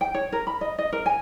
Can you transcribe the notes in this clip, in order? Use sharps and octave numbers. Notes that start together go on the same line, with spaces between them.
G5
C#5
A#4
B5
D#5
D#5
A#4
G#5